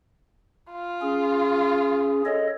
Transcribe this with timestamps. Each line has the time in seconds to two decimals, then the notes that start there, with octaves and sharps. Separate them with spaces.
0.71 F4
1.02 C#4 G#4
2.25 A4 C#5 D#5